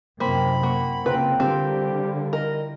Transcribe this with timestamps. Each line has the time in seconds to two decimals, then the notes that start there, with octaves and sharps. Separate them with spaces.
0.20 F#2 C3 A#3 C4 E4 G#5 B5
0.63 A#3 F#5 C#6
1.06 C#3 A#3 C4 F4 B4 G5 A#5
1.40 D3 G3 C4 F4 G4 A#4 A5
2.33 E4 A#4 D#5